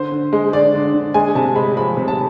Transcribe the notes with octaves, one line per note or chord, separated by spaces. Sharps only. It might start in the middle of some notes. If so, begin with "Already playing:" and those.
Already playing: D3 C5
D3
G#3
D3 D5
D3
D3
G#3 G#5
C3 A5
G#3 B5
F3 B5
C3
A5